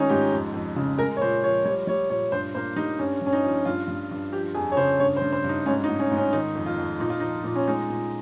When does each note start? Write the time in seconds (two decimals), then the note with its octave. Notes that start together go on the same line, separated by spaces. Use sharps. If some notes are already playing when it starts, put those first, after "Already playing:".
Already playing: D#3 G#3 C#4 D#4
0.10 G#2 G4
0.32 F2
0.54 F2
0.76 C#3
0.98 G#3 A#4
1.17 C#5
1.22 A#2 C5
1.44 F3 C#5
1.65 G3 C#5
1.87 G3 C#5
2.10 A#2 C#5
2.32 G2 C5
2.55 A#3 C5
2.76 G3 D#4
2.99 G2 C#4
3.22 G2 C#4
3.33 D#4
3.44 F3
3.65 G2 F4
3.88 G2
4.11 G2
4.33 F3 G4
4.55 F2 G#4
4.72 C#5
4.77 C#3 C5
5.00 G2 C#5
5.17 C5
5.21 G2
5.33 C5
5.44 G2 D#4
5.66 G#2 C#4
5.84 D#4
5.89 G#2
5.99 C#4
6.11 G#2
6.17 C#4
6.33 D#3 D#4
6.55 F2
6.66 F4
6.78 F2
7.00 A#2 D#4
7.10 F4
7.20 F3 D#4
7.44 A#2
7.56 C#4
7.67 G#3 D#4
7.90 A#2